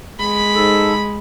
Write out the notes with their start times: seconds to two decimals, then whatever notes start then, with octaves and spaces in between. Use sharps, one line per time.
0.19 G#3 B5
0.55 G#2 A4